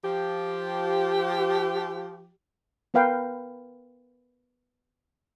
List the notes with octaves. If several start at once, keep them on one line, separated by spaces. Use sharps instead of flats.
F3 G4
B3 A#4 B4 F5 G5